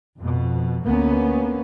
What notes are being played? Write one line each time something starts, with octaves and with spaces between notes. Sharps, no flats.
F2 B2
D2 A#3 B3 C#4